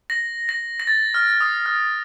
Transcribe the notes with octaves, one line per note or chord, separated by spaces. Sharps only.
A#6
A#6
A#6
A6
F6
D#6
F6